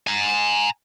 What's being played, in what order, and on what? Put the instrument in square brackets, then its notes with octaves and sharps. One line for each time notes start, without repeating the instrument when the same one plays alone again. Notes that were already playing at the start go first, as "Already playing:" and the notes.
[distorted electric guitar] G#5 A#5